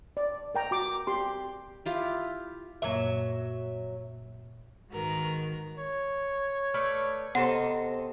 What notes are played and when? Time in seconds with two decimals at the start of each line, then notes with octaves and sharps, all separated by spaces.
0.17 D5
0.55 A#4 G5 A#5
0.71 F#4 D6
1.07 G4 C6
1.86 E4 F4 G4
2.82 F#2 A#2 F#3 A#3 E5
4.91 G#2 D#3 F#4 A#4 B4
5.78 C#5
6.74 A3 B4 D5 F6
7.35 C3 B3 A4 C5 D#5 F#5 A5